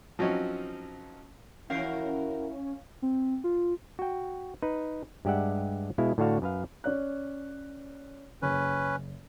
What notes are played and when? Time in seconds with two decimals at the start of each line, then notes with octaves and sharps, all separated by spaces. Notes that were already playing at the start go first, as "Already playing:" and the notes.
0.19 F3 F#3 C4 C#4 D#4
1.70 E3 C#4 E4 F#4 A#4 F5 C7
3.02 C4
3.44 F4
3.99 F#4 G5
4.63 D#4 B4
5.25 G2 G#3 G4 D5 E5 F#5
5.98 B2 G#3 E4 F5
6.18 A2 D3 D4 F#4 F5 A5
6.42 F#2 B4 F5
6.84 C#4 D5 F#6
8.42 F#1 C#4 B4